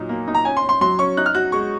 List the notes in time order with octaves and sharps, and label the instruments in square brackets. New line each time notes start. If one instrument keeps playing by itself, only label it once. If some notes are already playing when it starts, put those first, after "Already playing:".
Already playing: [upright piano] A#2 F#3 D#4
A#3
D#4
[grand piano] A#5
[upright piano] C#4 [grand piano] G#5
[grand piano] C6
[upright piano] C#4
[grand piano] C6
[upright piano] F#3 [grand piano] C6
[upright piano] C#4 [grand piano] C#6
[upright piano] D#4 [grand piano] F#6
[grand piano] F6
[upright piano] F#4 [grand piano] F#6
[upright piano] G#3 [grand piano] C#6